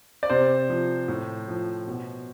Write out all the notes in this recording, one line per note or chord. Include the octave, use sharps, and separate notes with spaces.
D5
C3 C5
F3
A2
F3
B2